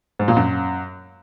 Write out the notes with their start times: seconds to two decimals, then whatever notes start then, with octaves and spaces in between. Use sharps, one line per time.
0.19 G#2
0.28 A#2
0.37 F#2